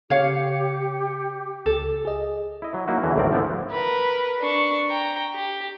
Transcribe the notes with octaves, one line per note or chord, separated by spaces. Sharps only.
C#3 G4 C#5 F5 C#7
C#2 A4
G#4 D#5
E4 D#5
F#3
F#3 A#3 D#4 E4 F#4
E2 D3 E3 F#3
G#1 D2 A2 C4 A#4 D5
D3 F3 A3 B3 D4 E4
A#4 B4
D4 C#6
G5 A#5
G4